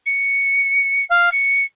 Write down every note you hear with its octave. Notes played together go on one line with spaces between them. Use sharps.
C#7
F5
C#7